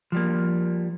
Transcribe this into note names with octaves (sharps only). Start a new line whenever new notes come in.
F3 G3 A#3